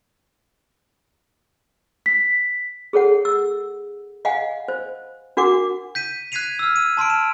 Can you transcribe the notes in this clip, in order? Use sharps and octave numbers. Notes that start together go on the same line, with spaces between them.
B6
G#4 A4 C#5 F#5
E6
D#5 F5 F#5 G#5
C5
D4 F#4 A#4 F#5 D6
G6 B6 D#7
F#6 G#6 B6 C7 D#7 F7
E6 F6
D#7
A5 C6 F6 D7
E7